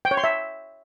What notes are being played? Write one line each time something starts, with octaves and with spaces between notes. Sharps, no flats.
G5
C#5
C6
E5